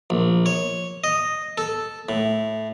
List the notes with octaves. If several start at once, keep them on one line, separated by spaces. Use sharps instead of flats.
A#1
C#5
D#5
A4
A2